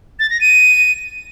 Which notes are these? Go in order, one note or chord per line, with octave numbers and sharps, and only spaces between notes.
A6
A#6
D#7